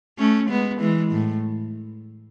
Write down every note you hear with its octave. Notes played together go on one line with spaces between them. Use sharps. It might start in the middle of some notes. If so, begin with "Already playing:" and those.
A3 C#4
G#3 B3
E3 G#3
A2